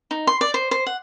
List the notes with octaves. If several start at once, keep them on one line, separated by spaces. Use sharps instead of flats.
D#4
C6
D5
C5
C5
F#5